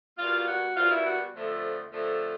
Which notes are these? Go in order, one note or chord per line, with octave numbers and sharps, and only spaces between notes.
B2 G3 A#3 F4
F#4
B2 G3 A#3 F4
E4
F#4
F2 D3 F3 A3
F2 D3 F3 A3